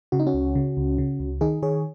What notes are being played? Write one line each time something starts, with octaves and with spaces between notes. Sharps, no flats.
C#3 F#4
D#4
C#4 F#4
C#2
C#3
C#2
C#3
C#2
D#3 D#4 G#4
D#3 G#4 C#5